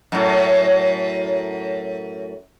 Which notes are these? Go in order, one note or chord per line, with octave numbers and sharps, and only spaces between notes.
F#2 A2